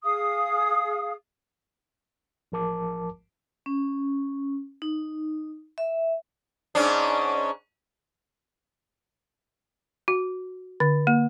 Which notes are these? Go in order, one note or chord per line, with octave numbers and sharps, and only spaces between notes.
G#4 F5 D#6
A1 F3 A#4 A5 D6
C#4
D#4
E5
G#2 C#4 D4
F#4
D3
A#3